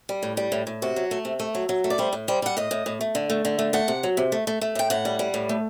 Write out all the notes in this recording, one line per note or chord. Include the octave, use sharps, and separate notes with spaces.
G3
A2
G3
A2
A2
C3 F#4
F#3
A3
C3
A3
F#3
F#3
A3
D5
G3 C5
A2
G3 C5
G3 F#5
A2 D#5
A2
A2
A3
D3
A3
D3
A3
A3 F#5
C3
F#3
C3
A3
A3
A3
A2 G5
A2 F#5
G3
G3
A2
A3